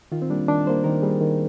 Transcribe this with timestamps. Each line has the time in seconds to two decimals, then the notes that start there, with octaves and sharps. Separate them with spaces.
0.12 D#3 F4
0.22 C4
0.30 G3 A#3 D4
0.48 D#3 D4
0.66 G3 A#3 C5
0.84 D#3 A#4
1.02 G3 A#3 G#4
1.21 D#3